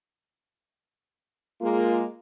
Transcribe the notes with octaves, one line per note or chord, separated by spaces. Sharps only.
G#3 A#3 F4